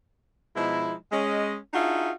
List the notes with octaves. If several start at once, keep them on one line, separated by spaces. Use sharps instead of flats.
B2 F3 G#3 D#4 E4
G#3 C#4 D#5
D4 D#4 F4 F#4 G#4 E5